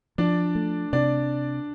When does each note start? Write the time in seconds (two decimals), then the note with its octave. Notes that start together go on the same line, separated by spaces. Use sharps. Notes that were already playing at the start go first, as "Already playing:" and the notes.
0.18 F3 D4 D5
0.55 A3
0.93 C3 D4 D5